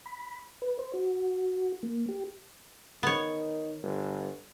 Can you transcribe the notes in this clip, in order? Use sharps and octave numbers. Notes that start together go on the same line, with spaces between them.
B5
B4
C5
F#4
A#3
G4
D#3 B3 C#5
G1